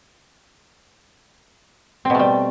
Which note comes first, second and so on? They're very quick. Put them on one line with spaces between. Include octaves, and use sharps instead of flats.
C4 B2 A3 G3